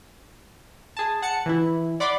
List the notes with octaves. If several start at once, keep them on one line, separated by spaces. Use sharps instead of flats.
G#4 A5
F#5 A5 C#7
E3 E4
D5 F#5 B5 C6 D6